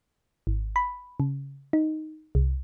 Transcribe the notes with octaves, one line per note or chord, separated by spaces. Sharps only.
G#1
B5
C#3
D#4
C2